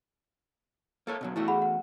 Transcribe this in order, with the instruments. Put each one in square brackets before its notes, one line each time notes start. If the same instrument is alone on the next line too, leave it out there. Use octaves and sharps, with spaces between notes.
[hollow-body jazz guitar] A#3 A4 C#5
B2 D3 F#3
[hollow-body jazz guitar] E2 A3 F#4 [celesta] E4
[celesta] G#4 F#5 B5
F#5